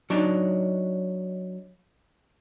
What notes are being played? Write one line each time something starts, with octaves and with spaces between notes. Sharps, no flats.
F#3 D4 D#4